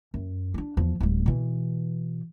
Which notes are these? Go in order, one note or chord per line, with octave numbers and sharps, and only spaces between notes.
F#2
D4 D#4
E2 F3
D1 G3
B2 E3